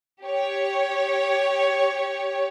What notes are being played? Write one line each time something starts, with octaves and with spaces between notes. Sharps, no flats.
G4 C#5